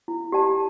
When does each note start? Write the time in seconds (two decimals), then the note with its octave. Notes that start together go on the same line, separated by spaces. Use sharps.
0.08 E4
0.32 G4 D5 A5